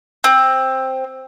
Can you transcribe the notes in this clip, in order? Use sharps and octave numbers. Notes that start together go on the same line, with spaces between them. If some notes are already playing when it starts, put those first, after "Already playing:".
C4